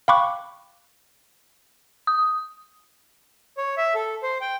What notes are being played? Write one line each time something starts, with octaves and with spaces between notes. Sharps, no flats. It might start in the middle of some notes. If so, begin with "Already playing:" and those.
F5 G5 B5 C#6 D6 F#6
D#6
C#5
E5
A4
C5
G5